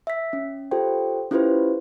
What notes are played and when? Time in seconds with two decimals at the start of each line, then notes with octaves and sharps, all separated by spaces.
0.07 E5 B6
0.33 C#4
0.71 F4 G4 A4 C5 G5
1.31 C#4 E4 F4 G4 B4 C5